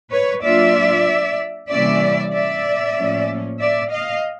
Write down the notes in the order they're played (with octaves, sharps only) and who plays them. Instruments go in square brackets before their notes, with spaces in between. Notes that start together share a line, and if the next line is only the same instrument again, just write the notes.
[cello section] B4 C#5
F#3 A#3 D4 F4 D5 E5
C3 E3 G3 A#3 C#4 D5 E5
D5 E5
A2 F3 A#3 C#4
D5 E5
D#5 F5